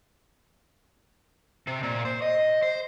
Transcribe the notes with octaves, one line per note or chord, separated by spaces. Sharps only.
C3
A#2
C5
D#5
C5